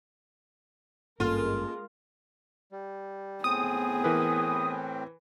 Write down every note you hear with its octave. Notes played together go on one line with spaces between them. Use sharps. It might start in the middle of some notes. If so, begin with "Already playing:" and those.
G#1 G2 G#3 A#3 C#4 F4 A4 A#4
G3
A2 B3 C4 G#4 D#6
E3 A#4 B4